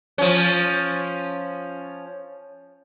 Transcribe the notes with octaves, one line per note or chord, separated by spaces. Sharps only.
F3 C#4